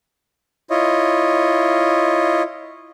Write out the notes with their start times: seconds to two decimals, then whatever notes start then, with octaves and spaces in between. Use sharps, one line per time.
0.70 E4 F4 C#5 D#5